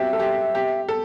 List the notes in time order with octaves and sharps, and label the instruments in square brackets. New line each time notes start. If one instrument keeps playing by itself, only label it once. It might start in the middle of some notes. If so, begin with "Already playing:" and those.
Already playing: [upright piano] C4 F#4 G4 [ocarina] E5
[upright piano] A4
G4
G4
A4